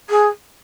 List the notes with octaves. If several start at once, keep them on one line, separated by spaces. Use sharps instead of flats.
G#4